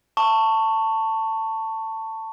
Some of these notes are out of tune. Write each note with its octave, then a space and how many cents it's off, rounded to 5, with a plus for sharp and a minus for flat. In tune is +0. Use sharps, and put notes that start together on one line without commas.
A5 +15 C#6 +0